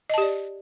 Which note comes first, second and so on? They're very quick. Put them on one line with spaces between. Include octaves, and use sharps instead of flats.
D#5 A5 G4 D5